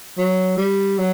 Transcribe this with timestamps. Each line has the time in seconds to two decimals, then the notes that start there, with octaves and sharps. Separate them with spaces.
0.18 F#3
0.57 G3
0.98 F#3